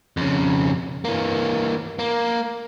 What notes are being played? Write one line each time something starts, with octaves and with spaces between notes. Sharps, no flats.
F2 C#3
E3 A#3
A#3